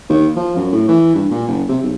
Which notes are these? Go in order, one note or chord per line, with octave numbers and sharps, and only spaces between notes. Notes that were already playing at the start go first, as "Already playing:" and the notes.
D#2
F3
F#2
A2
E3
G2
A#2
F#1
C3
B1